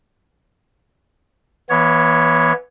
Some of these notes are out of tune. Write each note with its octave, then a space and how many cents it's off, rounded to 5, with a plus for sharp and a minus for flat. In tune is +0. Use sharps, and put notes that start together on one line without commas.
E3 +0 B3 -35 C#5 +0